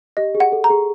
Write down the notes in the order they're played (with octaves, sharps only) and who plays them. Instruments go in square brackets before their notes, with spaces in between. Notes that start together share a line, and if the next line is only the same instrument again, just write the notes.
[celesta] G4 [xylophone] D#5
[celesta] G#4
[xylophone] F#5
[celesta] A4
[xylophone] A#5
[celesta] G#4